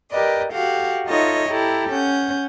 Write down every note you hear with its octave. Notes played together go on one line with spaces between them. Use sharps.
G4 A#4 B4 D5 D#5
F#4 G4 A4 F5 F#5
D#4 F4 A4 C#5 D#5 E5
E4 G4 A4 A#5
C#4 F#5 G6